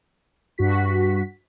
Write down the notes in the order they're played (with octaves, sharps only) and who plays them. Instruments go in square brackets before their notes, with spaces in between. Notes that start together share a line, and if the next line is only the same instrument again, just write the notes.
[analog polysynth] G2 F#4 B6